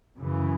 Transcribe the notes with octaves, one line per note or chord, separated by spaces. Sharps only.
F#2 C#3 E3